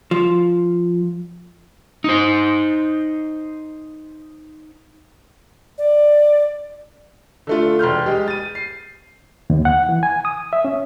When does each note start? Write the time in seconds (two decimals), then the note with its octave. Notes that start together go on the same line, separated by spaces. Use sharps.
0.11 F3
2.04 D#4 C5
5.78 D5
7.47 D3 A3 F4
7.79 E1 C6 F6 G6
8.06 G#3 G4
8.28 A6 D#7
8.55 C7
9.50 D#2
9.65 F#5
9.89 E3
10.03 G#5
10.25 D#6
10.53 E5
10.65 C#4